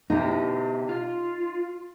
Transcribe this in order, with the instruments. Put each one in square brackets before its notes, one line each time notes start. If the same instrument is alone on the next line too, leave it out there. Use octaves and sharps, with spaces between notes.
[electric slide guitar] B2 G4 [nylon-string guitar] D#4
[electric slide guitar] F4